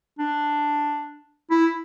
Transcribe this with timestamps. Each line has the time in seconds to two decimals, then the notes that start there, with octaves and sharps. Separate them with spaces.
0.19 D4
1.51 E4